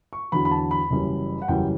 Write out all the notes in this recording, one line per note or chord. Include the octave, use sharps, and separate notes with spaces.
C#6
E2 D3 F#3 B5
B5
A5
B5
F#1 F#2 E3 G3
F#5
F#1 F#2 E3 G3 G5